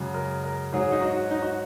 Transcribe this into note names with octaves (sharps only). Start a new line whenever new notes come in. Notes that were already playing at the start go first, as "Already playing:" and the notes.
Already playing: F#2 C#3 G#3
A#4
A#4
G#2 F#3 G#4
D#4
F#4
D#4
F#4